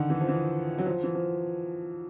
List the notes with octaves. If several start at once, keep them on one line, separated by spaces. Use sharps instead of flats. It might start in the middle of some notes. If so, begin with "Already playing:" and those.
Already playing: D3 D#3
E3
F3
E3
F#3
F3
E3
F3